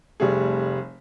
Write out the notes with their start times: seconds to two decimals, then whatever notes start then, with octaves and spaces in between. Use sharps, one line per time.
0.20 F1 G3 A3 G#4